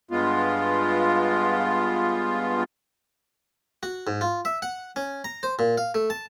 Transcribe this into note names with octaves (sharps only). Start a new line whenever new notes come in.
G2 G#3 B3 F4
F#4
G#2
F4
E5
F#5
C#4
A#5
C5
A#2
F5
A3
A5